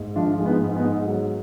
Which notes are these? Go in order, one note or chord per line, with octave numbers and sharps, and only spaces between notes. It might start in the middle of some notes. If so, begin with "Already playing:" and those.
Already playing: G#2
F3 D4 F4
G#3 F4
B3 D#4
G#2
B3 D#4
G#2
F#3